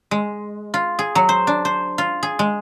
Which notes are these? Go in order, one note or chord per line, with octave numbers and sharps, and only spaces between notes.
G#3
F4
G#4
F#3
C5
D4
C5
F4
G#4
G#3